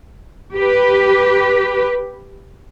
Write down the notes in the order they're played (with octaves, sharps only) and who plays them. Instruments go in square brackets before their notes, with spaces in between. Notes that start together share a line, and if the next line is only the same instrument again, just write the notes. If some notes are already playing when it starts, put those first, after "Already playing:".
[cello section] G4 B4